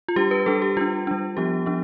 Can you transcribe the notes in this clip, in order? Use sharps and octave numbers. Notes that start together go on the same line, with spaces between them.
F4
G3 D4 G4
B4
G3 D4 A4
G4
G3 D4 F4
G3 D4
F3 B3 D4 G4
F3 B3 D4